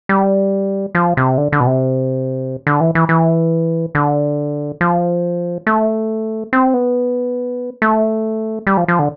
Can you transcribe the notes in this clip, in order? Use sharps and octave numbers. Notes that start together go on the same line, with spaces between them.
G3
F3
C3
D3
D3
B2
C3
D3
E3
E3
E3
D3
F3
A3
C4
B3
A3
G3
F3
F3
D3